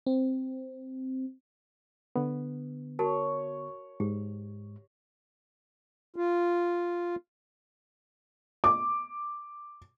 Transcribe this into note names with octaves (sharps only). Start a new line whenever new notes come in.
C4
D3 B3
F#4 A#4 C#5 A5
G#2 G4
F4
D6